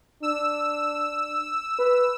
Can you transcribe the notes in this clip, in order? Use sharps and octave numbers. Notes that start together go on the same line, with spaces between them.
D4 E6
B4